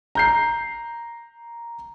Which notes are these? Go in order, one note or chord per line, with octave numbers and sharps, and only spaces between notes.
A#5 G6 C7